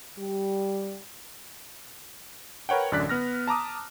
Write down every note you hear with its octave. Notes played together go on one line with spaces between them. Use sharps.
G3
A#4 B4 C#5 F#5 G5
A1 F#2 D3 D5 F#6 B6
B3 F6 A#6
A5 A#5 D6 D#6